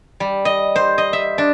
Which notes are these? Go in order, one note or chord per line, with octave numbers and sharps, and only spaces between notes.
G3
D#5
C5
D#5
E5
D4